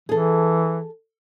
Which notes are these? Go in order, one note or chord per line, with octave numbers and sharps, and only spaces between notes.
E3 G#4 A4